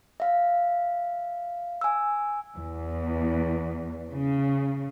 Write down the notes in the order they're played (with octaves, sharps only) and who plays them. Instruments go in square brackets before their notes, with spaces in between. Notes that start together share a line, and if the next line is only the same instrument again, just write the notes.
[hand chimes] E5 F5
G#5 E6
[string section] E2
C#3